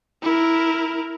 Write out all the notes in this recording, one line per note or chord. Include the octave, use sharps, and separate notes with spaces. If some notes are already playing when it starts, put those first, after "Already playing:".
E4 A#4